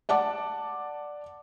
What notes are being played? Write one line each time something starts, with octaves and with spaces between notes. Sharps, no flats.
D5 F#5 A5 D6